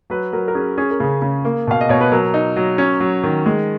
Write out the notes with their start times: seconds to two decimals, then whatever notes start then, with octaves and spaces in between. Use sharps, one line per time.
0.10 F#3 B4
0.33 F#3 A#4
0.48 A#4
0.55 C#4 G#4
0.78 C#4 G#4
0.91 A#4
1.00 C#3 G#4
1.22 C#3
1.45 A#3
1.67 B2 F5
1.81 D#5
1.89 B2 C#5
2.01 B4
2.12 F#3 A#4
2.34 D#4
2.56 F#3
2.78 C#4
3.00 F#3
3.24 D#3
3.46 G#3